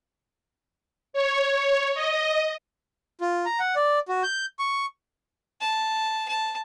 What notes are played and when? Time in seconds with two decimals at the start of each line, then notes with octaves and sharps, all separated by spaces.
1.13 C#5
1.95 D#5
3.21 F4
3.46 A#5
3.59 F#5
3.76 D5
4.08 F#4
4.23 G6
4.59 C#6
5.61 A5
6.28 A5